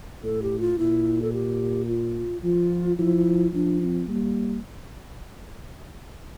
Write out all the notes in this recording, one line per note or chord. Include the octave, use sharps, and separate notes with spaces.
A2 A4
G4
F4
A#2 E4
A4
G4
F4
F3 F4
F3 E4
F3 D4
D4
C4
G3 A#3